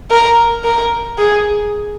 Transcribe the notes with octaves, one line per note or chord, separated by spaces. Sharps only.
A#4
A#4
G#4